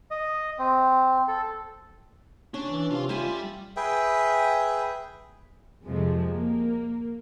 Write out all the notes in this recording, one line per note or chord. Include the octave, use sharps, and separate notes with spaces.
D#5
C4
A4
C#4 D4
E3
C3 F4 F5
G3 F4 C5 E5 G#5
G#4 B4 E5 G5
F2 C3 F3 G#3 A3
A#3